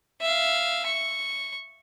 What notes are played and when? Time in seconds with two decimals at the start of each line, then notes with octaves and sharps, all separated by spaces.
0.22 E5 F5
0.86 C#6